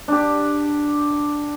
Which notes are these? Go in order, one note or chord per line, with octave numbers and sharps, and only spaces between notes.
D4 G4